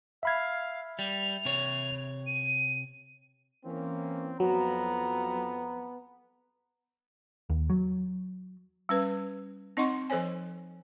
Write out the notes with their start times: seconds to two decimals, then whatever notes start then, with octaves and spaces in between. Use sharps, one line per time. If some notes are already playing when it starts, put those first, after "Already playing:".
0.23 E5 F5 B5 G#6
0.99 G3 F7
1.45 C3 C#5
2.27 D#7
3.64 E3 A#3 C4 C#4
4.40 F2 F#3 B3 A#5
7.50 D#2
7.70 F#3
8.89 G3 C#4 B4
9.77 C4 D#4 D#5 F#5 C6 C#6
10.10 F3 A4 C5 C#5 G#5